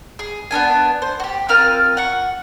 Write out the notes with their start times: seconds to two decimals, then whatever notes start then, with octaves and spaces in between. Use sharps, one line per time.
0.19 G#4
0.51 B3 C#4 D4 G#5
1.02 C5
1.20 F#4 G4
1.49 C4 F4 A#4 F6
1.97 F#5 C#6